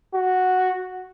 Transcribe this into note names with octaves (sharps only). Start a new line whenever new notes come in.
F#4